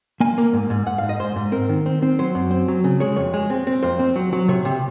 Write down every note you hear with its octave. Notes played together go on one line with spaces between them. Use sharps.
A#3 G#5
A#3
G#2
G#2
G#2 F#5
G#2 F5
D#5
G#2 C5
G#2
C4 A#4
D#3
C4
C4
F#3 C5
F#2
C4
F#3
C#3
G#3 C#5
F2 C#5
G#3
C4
C4
F2 C5
C4
F#3
F#3
C3 C#5
C3